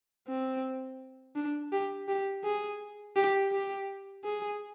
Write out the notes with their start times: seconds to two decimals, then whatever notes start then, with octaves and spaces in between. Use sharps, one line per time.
0.28 C4
1.36 D4
1.72 G4
2.08 G4
2.44 G#4
3.16 G4
3.52 G4
4.24 G#4